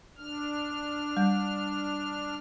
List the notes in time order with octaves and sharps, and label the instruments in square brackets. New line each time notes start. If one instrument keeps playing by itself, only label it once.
[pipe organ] D4 F6
[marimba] G3